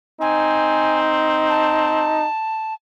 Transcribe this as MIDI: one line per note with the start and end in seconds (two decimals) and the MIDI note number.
0.21 2.22 60
0.21 2.26 63
0.21 0.99 80
1.50 2.74 81